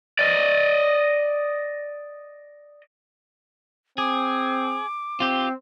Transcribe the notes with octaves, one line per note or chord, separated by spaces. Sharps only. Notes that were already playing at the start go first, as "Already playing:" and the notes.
D5 D#5
C4 G#4 D6
C4 F4 G4